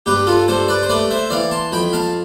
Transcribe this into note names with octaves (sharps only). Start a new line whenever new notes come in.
G2 G4 B4
F4 A4
G2 A4 C5
B4 D5
C5
A3 B4 D5
C5 E5
E3 D5 F5
A5 C6
F2 G5 B5
F5 A5